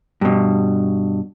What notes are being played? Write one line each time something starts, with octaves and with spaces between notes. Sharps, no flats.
G2 B2